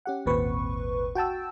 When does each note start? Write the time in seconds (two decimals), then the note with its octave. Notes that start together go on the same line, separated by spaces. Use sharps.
0.06 C#4 G4 F#5
0.26 G#1 D#2 A#2 C4 B4 C#6
1.15 F#4 G5 A5 E6